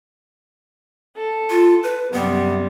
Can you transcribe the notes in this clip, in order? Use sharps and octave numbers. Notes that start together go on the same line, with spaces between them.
A4
F4
B4
F#2 C3 G3 B3